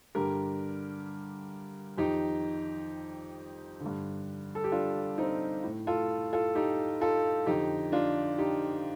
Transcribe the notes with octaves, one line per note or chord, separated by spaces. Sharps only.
G2 D3 G4 A#4
F2 D#3 D#4 G4
D3
G2
A4
G4
D4 F4
C4 D#4
A2
F4 A4
F4 A4
D#4 G4
F4 A4
F2 D3 D#4 G4
D4 F4
D#4 G4